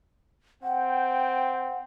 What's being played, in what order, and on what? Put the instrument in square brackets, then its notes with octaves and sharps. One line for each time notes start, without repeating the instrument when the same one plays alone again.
[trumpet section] C4 G5 [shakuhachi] F#5